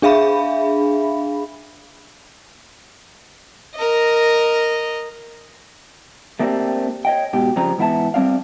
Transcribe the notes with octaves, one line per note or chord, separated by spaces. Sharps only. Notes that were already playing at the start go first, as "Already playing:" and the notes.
D4 G#4 E5 F5 B5
A#4 D#5
A3 A#3 C4 D4 G4 A4
C#5 D#5 G5
G#2 B2 G4
F2 C#3 F3 G3 C4 A#5
G#2 E3 B3 E4 E5 A5
G3 G#3 C4 D4 F5